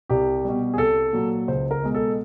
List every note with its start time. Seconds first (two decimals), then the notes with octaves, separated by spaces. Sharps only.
0.10 C2 G4
0.45 B2 G3
0.74 G#4
0.78 C2 A4
1.13 A#2 F#3
1.48 C#2 C5
1.71 A#4
1.83 B2 G#3
1.95 A4